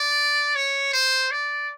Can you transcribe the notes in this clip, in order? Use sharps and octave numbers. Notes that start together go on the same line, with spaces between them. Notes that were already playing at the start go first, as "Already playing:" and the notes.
Already playing: D5
C#5
C5
D5